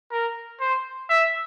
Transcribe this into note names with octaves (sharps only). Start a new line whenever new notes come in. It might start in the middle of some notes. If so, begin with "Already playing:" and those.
A#4
C5
E5